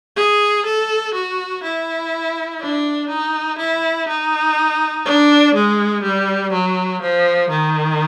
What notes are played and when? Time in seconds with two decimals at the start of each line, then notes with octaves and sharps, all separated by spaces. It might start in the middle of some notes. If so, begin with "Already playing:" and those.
0.16 G#4
0.66 A4
1.14 F#4
1.64 E4
2.61 D4
3.09 D#4
3.58 E4
4.08 D#4
5.06 D4
5.55 G#3
6.03 G3
6.53 F#3
7.02 F3
7.50 D#3